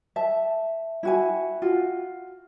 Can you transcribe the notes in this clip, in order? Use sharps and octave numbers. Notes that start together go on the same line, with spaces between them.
E5 A5
E4 F#4 G#5
F4 F#4